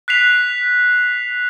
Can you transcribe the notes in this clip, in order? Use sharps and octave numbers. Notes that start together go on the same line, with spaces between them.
F#6 B6 C7 F7